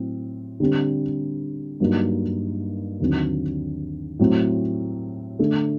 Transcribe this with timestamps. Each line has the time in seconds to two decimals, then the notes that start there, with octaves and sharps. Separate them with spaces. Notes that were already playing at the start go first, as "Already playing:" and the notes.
Already playing: A2 F#3 C4
0.60 D3 G3 C4
1.80 G2 F#3 A#3 D#4
3.00 D#2 D3 F#3 C4
4.19 A2 F#3 C4
5.39 D3 A3 D4